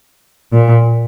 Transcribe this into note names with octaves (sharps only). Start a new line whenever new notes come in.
A#2